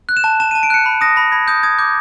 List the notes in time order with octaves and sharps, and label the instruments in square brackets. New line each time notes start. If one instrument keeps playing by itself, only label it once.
[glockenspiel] F#6
E7
A5
A5 E7
A5 D#7
D7
F#6 C#7
B5
D#6 A#6
B5 A#6
B5 G#6
D#6 G6
D#6 G#6
D6 G6